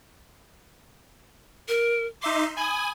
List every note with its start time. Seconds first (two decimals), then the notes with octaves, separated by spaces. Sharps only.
1.68 A#4
2.22 D#4 E5 C6 D6
2.57 G#5 B5 D#6